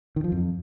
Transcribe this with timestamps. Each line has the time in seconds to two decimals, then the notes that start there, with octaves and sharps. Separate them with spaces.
0.16 D#3
0.24 F3
0.32 F2